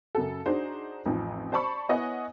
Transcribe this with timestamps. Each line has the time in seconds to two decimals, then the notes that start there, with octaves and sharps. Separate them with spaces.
0.15 F#2 C#3 F#4 A4
0.46 D4 D#4 F#4 G#4 C5
1.06 A1 F2 F3 D#4
1.52 C5 D5 A5 B5 C#6
1.89 B3 E4 C#5 D#5 F#5 G#5